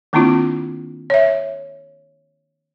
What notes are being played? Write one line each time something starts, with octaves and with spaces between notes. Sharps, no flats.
D#3 A#3 C4 D4 E4 F4
C#5 E5